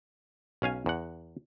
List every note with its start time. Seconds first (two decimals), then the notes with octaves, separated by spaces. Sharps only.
0.62 B1 C#4 F5 G#5
0.86 E2 F#5